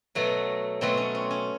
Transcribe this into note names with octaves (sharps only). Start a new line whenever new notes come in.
B2 F#3 A3
B2 F#3 A3 C4
C#4
C4
C#4